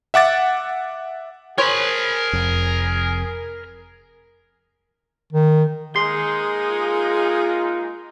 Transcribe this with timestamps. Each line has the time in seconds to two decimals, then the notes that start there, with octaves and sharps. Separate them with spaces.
0.14 E5 F#5 D6 A6
1.58 G#4 A#4 C5 C#5 B5
2.33 F1 F2
5.33 D#3
5.96 G#3 A#3 D#4 G#4 C6
6.70 F4